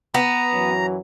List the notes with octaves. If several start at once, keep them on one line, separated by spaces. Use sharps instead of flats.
B3 A#5
F#2 E3 F#3